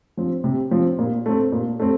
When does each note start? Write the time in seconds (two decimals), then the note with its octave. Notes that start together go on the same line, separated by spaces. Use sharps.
0.17 F3 C4
0.44 C3
0.71 F3 C4
0.99 A#2
1.26 A3 C4
1.52 A#2
1.80 A3 C4